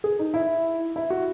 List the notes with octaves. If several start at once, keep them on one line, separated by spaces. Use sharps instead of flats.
G#4
D#4
E4
E4
F#4